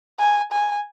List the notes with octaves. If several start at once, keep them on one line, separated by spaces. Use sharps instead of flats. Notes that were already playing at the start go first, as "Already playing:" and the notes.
G#5
G#5